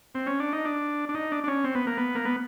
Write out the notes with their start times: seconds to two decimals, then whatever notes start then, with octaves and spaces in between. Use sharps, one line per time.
0.15 C4
0.26 C#4
0.40 D4
0.53 D#4
0.65 D4
1.09 D4
1.14 D#4
1.32 D4
1.44 D4
1.48 C#4
1.64 C4
1.75 B3
1.87 A#3
1.97 B3
2.15 A#3
2.25 B3